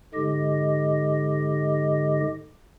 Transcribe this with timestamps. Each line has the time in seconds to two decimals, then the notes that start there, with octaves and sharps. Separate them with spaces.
0.14 G#2 D3 G#3 G4 D#5